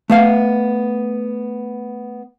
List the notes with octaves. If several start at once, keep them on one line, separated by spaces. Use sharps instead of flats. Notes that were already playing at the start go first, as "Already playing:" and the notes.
A3 B3 F5